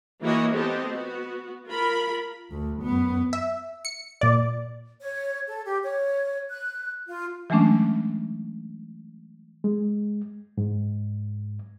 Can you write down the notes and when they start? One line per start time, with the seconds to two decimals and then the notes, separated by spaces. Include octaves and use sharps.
0.22 E3 A#3 E4 F#4 C#5 D#5
0.54 B3 C4 G4 A4 D#5
0.92 B3 F#4
1.68 F4 A#4 B5
2.51 D2
2.82 F#2 B3
3.33 E5
3.85 C#7
4.21 A#2 D5
5.01 C#5
5.47 A4
5.64 G4
5.84 C#5
6.50 F#6
7.08 F4
7.50 E3 F#3 G#3 A3 C#4 D4
9.64 G#3
10.58 G#2